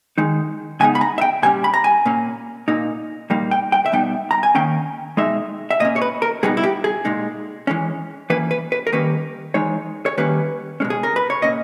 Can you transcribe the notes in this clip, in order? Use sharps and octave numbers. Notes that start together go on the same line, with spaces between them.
D#3 G#3 D#4
C#3 G#3 B3 D#4 G#5
B5
A#5
E5
G5
A#2 G3 C#4 G#5
B5
A#5
G#5
A#2 A#3 C#4
A#2 A#3 D#4
A#2 G3 A#3 D#4
G5
G5
E5
B2 G3 B3 D#4 G5
A#5
G#5
D#3 A#3 C#4 G5
B2 G#3 D#4 E5
E5
A#2 A#3 C#4 D#5
C#5
B4
A#4
B2 G3 B3 D#4 G#4
E4
G4
G#4
A#2 G#3 D#4
E3 G#3 C#4
E3 A#3 C#4 B4
B4
B4
A#4
D#3 G3 A#3 C#4 B4
E3 G#3 D#4 C#5
C#5
D#3 G3 A#3 C#4 B4
B2 G#3 C#4
G#4
A#4
B4
C#5
A#2 A#3 C#4 D#5